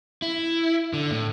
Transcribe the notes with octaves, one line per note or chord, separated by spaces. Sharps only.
E4
D3
A2